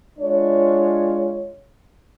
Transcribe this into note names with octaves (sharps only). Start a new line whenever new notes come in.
G#3 D4 F4 C#5